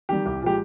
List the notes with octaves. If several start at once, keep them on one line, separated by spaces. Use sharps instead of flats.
D#3 G3 G4
C2 G4
A#2 F3 G#3 G4